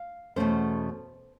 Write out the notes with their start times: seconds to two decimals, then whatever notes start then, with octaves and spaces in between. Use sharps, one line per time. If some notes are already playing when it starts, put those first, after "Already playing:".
Already playing: F5
0.36 E2 B2 F#3 A3 C#4 C5